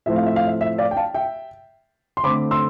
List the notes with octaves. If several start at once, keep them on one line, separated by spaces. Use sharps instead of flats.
A2 F3 A3 C4 E5
F5
E5
F5
E5
E5
D5 F5
G5
F5 A5
E5 G5
C6
D3 A3 C4 B5 D6
C6 E6